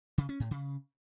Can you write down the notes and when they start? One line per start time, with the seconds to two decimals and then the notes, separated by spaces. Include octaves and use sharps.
0.18 C#3
0.29 C#4
0.40 A2
0.51 C#3